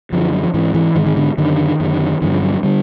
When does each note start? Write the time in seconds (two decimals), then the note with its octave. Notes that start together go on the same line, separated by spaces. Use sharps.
0.12 F#2 D3 F3
0.33 F#3
0.43 F3
0.54 G#2 E3
0.74 E3
0.95 G#2 D#3
1.06 D#3
1.17 D3
1.38 F#2 D3 D#3
1.80 F#2 D3
2.21 G2 D3 E3
2.32 F3
2.42 F#3
2.53 F#3
2.63 D3 G3